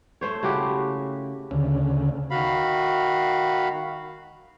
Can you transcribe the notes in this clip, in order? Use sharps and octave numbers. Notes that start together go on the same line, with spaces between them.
A3 C5 C#5
C#3 E4 F#4 G4
D2 C#3
D#3 F#4 F5 B5